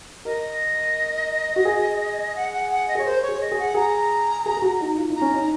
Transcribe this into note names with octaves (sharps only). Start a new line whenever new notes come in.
A#4 D#5
F#4
G#4
F#5
F#5
F#5
D#5
G#4 C#5
A#4 C5
C#5
G#4
D#5
G#4
F#5
G#4 A#5
G#4
G#4
F#4
D#4
F4
D#4
A#5
C#4
D#4